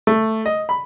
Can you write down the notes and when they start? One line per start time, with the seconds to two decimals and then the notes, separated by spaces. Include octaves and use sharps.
0.07 A3
0.46 D#5
0.69 B5